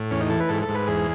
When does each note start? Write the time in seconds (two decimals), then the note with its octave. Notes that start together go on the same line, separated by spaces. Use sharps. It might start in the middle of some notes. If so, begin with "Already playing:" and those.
Already playing: A2
0.11 E2 C#4
0.21 D#4
0.30 E3 A4
0.40 B4
0.49 G#2 A4
0.62 A4
0.69 G#2
0.75 B4
0.87 E2 G#4